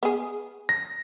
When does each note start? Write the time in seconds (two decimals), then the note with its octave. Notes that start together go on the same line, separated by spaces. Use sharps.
0.03 B3 G#4
0.69 A#6